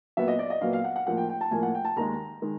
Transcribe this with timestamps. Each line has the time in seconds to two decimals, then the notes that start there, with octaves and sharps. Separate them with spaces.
0.17 A#2 F#3 B3 E5
0.28 D#5
0.39 D5
0.50 D#5
0.61 A#2 F#3 B3 F5
0.73 F5
0.84 F#5
0.96 F#5
1.07 A2 F3 A#3 F#5
1.17 G5
1.29 G5
1.41 A5
1.51 A2 F3 A#3 G#5
1.63 F#5
1.74 G5
1.85 A5
1.96 D#2 D#3 G#3 A#5
2.42 D#3 G#3